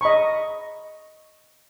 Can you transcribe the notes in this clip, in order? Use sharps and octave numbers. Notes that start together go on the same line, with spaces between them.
D#5 A#5 B5 C#6